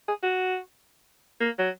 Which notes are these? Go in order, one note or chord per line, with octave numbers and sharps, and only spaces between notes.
G#4
F#4
A#3
F#3